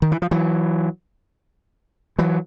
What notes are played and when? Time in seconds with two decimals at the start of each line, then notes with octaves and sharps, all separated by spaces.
0.02 D#3
0.12 E3
0.22 F3
0.31 E3 F#3
2.19 E3 F#3